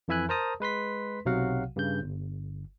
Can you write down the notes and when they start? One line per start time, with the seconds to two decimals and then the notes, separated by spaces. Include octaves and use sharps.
0.08 F2 E3 E4 E5 G#5 F#6
0.29 A#4 C5 A5 A#5 D#6
0.60 G#3 B4 C6 B6
1.25 B1 C3 F#3 F#4 F5 F#5
1.76 G2 C#3 G6
2.02 G1